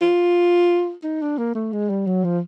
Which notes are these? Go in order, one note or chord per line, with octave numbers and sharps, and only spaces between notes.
F4
D#4
D4
A#3
A3
G#3
G3
F#3
F3